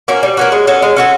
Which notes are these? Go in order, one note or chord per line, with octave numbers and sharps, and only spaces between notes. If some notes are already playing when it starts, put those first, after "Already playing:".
A#3 C#4 F#4
G3
A#3 C#4 F#4
G#3
C#4 F#4 A4
G#3
C#4 F#4 A4